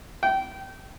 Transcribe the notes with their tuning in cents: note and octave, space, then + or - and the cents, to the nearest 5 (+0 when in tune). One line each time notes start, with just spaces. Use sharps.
G5 -25